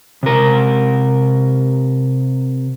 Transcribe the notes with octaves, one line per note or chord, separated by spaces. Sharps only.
C3 A#4